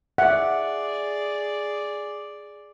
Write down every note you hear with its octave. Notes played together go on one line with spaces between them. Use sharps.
G#4 D5 E5 F#5